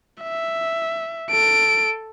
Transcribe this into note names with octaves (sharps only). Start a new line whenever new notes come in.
E5
A4 D7